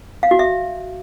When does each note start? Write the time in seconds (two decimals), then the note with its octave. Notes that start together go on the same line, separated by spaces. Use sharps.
0.23 F5
0.31 F#4
0.39 E5